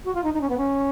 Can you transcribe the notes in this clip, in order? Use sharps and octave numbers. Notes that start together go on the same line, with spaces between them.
F#4
F4
D#4
D#4
C#4
B3
C#4